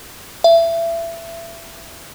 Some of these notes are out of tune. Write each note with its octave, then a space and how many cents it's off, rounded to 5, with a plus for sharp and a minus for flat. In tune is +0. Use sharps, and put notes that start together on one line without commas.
E5 +25